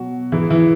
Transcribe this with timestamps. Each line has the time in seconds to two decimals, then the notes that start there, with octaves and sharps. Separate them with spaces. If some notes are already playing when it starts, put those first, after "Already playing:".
Already playing: B2 F#3 F#4
0.32 G#2 E3 G#3 E4
0.50 E3 E4